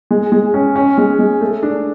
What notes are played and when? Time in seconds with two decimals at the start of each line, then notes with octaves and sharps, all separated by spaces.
0.11 G#3
0.32 G#3
0.54 C#4
0.76 C#4
0.98 G#3
1.19 G#3
1.41 A3
1.63 D4